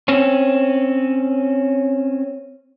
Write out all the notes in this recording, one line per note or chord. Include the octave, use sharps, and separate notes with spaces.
C4 C#4